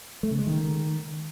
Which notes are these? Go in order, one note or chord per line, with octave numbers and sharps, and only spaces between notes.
A3
C#3
G#3
D#3